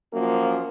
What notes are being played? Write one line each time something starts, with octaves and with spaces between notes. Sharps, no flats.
F#2 F3 A#3